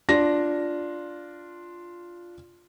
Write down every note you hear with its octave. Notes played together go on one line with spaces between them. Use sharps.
D4 F4 A#6